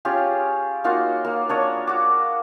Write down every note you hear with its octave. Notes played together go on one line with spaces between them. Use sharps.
C#4 F4 G4 G#4
A#3 D#4 F4 F#4
A#3
D4 C#5 D#5
F#4 D6